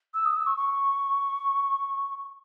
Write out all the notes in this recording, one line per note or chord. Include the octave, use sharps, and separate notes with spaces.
E6
D#6
E6
C#6
C#6